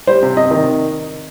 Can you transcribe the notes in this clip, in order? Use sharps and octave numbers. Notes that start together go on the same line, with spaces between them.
G3 C5
C3
C3 D#5
D#3